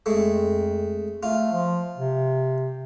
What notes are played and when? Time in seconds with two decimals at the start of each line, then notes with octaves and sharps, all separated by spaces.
0.06 F2 G#3 A3
1.23 A3 F4
1.52 F3
1.97 C3